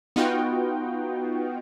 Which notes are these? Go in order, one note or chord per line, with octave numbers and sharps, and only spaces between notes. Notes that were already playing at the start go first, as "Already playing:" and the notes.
B3 D#4 F4 F#4 G5